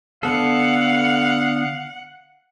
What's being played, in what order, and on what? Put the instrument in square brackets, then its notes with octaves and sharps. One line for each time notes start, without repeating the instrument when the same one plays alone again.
[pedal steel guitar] D3 B3 A4 [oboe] F5 [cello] F#5